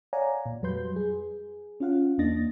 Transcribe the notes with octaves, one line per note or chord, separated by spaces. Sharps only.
C#5 D5 F5 F#5 G#5 A#5
A#2
F2 F#3 G3 B4 C6 G6
G#4
C#4 F4 F5 F#5
E2 A#3 D4 D#5 A6 A#6